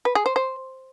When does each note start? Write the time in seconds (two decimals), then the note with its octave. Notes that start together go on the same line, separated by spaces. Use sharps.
0.05 B4
0.15 G#4
0.26 C5
0.36 C5